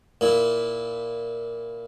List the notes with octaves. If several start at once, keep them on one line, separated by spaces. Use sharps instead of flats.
A#2 E4